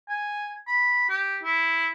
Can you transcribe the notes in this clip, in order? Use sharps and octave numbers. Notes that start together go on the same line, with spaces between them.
G#5
B5
G4
E4